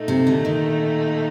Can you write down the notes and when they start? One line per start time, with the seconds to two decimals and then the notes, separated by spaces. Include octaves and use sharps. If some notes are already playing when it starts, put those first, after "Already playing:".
Already playing: A#2 A3 D#4
0.08 C3
0.27 D3
0.45 D#3